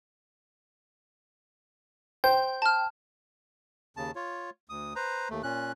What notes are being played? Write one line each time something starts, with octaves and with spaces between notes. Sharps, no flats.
C5 G5
A5 F6
D#2 C#3 A5
F4 C#5
D2 D#6
B4 C5 A#5
D#2 A3
A#2 C#4 F#6